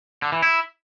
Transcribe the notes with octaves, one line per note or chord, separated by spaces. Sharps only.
D3
E3
E4